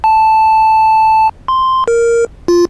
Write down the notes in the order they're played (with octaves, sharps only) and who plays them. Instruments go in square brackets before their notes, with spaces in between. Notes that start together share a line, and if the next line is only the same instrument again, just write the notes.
[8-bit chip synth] A5
C6
A#4
F4